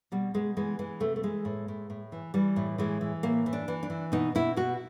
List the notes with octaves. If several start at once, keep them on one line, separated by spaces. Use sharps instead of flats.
B2 G3
B2 G#3
E3 G#3
E3 G#3
C3 A3
A3
E3 G#3
A2
A2
A2
E3
E3 G3
A2
E3 G#3
E3
A2 A#3
E3
D4
E3
D4
E3
B2 D#4
B2 E4
B2 F#4